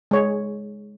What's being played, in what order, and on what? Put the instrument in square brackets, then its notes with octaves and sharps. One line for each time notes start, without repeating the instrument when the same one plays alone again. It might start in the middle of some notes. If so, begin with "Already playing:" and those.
[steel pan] G#3 C#5